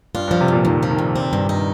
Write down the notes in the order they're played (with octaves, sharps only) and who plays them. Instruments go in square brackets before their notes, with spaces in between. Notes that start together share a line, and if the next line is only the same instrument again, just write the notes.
[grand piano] G2 [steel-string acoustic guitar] F4
[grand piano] G2 [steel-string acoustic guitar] F3
[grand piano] C3
[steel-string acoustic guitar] F2 [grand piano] A#2
[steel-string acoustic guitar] F2 [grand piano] D#3
[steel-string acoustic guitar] F3
[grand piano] D#3
[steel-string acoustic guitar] F2
C4
G2
D#4